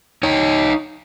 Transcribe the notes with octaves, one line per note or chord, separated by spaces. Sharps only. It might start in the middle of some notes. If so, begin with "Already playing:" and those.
D#4 C#5